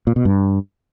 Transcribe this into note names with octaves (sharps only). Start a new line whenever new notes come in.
A#2
B2
G2